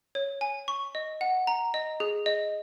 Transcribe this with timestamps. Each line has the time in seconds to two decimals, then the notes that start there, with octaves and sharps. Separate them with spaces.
0.15 C#5
0.41 G#5
0.68 C#6
0.95 D#5
1.21 F#5
1.47 A#5
1.74 D#5
2.00 G#4
2.26 D#5